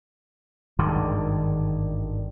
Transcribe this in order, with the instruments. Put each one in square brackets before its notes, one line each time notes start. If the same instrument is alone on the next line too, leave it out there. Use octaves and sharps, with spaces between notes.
[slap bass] G#1 G2 D3 D#3